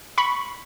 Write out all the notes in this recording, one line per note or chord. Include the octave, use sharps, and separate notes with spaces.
B5 C#6